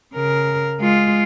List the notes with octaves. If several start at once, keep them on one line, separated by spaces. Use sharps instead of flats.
C#3 A#4
G#3 F4